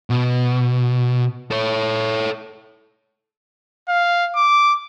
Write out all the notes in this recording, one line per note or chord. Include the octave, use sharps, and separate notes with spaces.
B2
A4 C#5
F5
D6